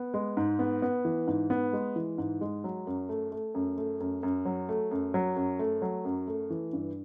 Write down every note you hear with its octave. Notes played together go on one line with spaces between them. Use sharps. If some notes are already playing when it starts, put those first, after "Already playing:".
Already playing: B3
G#3
G#2
B3
B3
E3
G#2
B3
G#3
E3
G#2
G#3
F#3
F#2
A3
A3
F#2
A3
F#2
F#2
F#3
A3
F#2
F#3
F#2
A3
F#3
F#2
A3
E3
G2